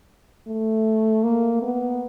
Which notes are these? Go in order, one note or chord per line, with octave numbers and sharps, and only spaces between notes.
A3
A#3
B3